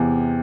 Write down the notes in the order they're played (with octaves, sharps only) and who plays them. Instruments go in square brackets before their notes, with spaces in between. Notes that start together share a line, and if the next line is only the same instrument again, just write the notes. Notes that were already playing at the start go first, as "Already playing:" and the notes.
Already playing: [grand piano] E2 C3